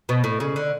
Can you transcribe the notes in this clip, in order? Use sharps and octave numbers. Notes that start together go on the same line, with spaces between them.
B2
A2
C#3
D3